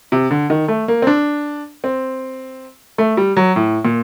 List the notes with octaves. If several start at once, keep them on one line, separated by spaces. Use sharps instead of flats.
C3
D3
D#3
A3
A#3
C4
D4
C4
A3
G3
F#3
A2
A#2